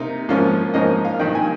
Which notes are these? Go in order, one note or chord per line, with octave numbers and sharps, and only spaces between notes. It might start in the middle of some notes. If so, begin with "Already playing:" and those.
Already playing: C3 A#3 D#4
G#2 F3 A#3 C#4
G#2 F3 A#3 C#4 D#5
F5
G2 D#3 A#3 D#4 G5
G#5